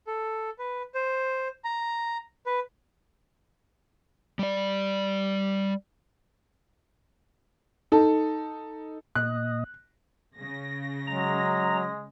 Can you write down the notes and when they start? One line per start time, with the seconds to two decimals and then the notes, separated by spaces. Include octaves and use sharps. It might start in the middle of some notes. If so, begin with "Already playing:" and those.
0.07 A4
0.59 B4
0.94 C5
1.64 A#5
2.46 B4
4.39 G3 D5
7.92 D#4 A4
9.15 A#2 D#5 F#6
10.37 C#3 A#6
11.07 F#3 G#3 A#5